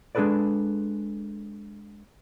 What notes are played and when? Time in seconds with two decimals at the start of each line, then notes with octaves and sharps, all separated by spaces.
0.15 G#3 D4 G#4 A4 B4 D5